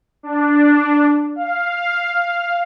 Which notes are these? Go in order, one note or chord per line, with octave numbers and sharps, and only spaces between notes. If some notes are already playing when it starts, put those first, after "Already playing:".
D4
F5